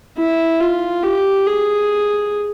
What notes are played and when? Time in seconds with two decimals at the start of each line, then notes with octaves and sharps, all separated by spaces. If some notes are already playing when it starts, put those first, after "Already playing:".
0.17 E4
0.60 F4
1.03 G4
1.46 G#4